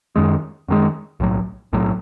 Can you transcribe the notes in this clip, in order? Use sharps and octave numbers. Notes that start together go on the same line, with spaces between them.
F#2 D#3 G#3
F#2 D#3 G#3
B1 A2 F#3
B1 A2 F#3